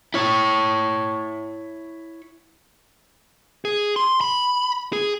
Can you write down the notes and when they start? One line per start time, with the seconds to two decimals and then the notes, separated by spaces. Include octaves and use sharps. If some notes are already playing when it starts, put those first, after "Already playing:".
0.14 E4 C#5
3.65 G#4
3.96 C6
4.21 B5
4.93 G#4